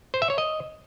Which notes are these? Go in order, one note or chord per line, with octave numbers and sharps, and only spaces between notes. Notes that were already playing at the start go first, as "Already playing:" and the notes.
C5
E5
C#5
D#5